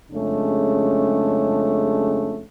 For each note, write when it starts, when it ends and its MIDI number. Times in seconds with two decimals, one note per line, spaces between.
0.11 2.42 41
0.11 2.42 49
0.11 2.42 56
0.11 2.42 57
0.11 2.42 61
0.11 2.42 62